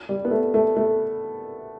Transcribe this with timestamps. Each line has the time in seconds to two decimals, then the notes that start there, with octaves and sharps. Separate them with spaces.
0.09 G3
0.25 B3
0.31 A3
0.54 A3
0.77 A3